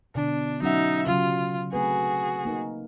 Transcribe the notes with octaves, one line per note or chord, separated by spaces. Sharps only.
B2 D3 D4
F#3 C#4 D#4 E5 F#5
C#3 F#3 F4
A3 C4 F#4 G#4 B4
A#3 D#4 A#4